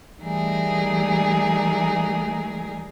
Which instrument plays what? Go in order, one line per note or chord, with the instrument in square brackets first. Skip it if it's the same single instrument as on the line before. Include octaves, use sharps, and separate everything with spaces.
[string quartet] E3 G3 A3 D#4 G#4 A#4